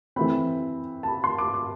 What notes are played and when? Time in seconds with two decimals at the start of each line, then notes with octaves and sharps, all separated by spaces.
0.16 E3 A3 C4 B5
1.03 A5
1.08 B5
1.24 C6
1.38 D6
1.54 D6